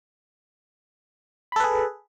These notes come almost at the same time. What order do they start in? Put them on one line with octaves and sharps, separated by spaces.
B5 A4 B4 G#4